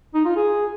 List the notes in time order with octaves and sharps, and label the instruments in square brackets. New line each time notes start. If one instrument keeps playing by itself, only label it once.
[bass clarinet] D#4
F4
G#4